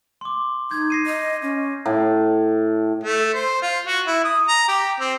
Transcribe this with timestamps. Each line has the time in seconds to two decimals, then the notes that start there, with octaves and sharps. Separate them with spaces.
0.21 C6 D6
0.71 D#4 G6 G#6
0.90 A#6 C7 D#7
1.06 D#5
1.42 C#4
1.86 A2
3.04 A3
3.34 C5
3.62 F4
3.87 F#4
4.07 E4
4.24 D#6
4.48 A#5
4.68 G4
5.00 C4